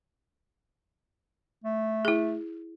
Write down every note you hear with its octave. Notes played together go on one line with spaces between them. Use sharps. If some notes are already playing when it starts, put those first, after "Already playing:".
A3
E4 G#4